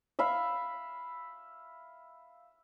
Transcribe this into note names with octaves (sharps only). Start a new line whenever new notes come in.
E5 F5 B5